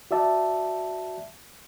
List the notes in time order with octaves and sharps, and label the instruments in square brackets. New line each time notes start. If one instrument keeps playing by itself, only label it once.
[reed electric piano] F#4 D5 E5 A5